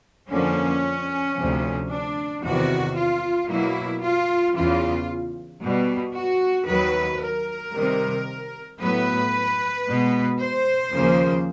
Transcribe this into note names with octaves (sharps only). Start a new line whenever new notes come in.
F2 D3 F3 A#3 C#4
D2 C3 F3
D4
E2 C3 D#3 F#4
F4
B2 F#3 A#3 E4
F4
E2 C#3 E3 F4
B2 G3 B3
F#4
D#2 D#3 F#3 B4
A#4
C3 D#3 G3
A2 F#3 B3 B4
B2 G#3 B3
C5
D#2 C#3 F3 A#3